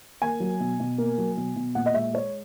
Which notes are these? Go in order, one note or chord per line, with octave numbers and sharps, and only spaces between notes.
A#3 G#5
F#3
B2
B2
A#3
F#3
B2
B2
A#2 F#5
D#5
G#3 E5
G#3 C#5